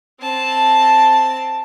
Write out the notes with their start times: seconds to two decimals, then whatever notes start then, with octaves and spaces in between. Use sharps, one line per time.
0.21 C4 A5